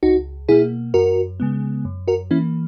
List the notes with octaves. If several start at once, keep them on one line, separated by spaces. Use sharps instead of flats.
C#2 D#4 F#4
B2 A#3 E4 G#4
F#2 F#4 A#4
C#3 G#3 B3
F#2
F#4 A#4
E3 A#3 C#4 E4